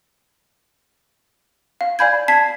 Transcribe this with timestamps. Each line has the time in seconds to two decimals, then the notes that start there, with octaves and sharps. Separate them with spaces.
1.81 F5
1.99 D5 F5 G#5 B5 G6 G#6
2.28 A5 G#6 B6 C7